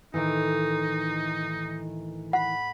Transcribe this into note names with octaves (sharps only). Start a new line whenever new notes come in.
A2 D#3 E3 D#4
F#5 B5